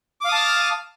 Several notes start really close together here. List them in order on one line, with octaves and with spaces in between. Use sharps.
D6 F5 D#6 A5 F6